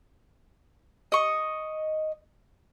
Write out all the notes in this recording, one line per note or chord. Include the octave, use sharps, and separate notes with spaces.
D#5 C#6